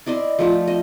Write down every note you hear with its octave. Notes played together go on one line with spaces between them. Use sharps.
E4 D5 D#5 C6
F3 A3 F4
D#5